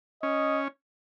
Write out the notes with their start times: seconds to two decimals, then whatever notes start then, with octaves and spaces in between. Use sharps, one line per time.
0.22 C#4 D#5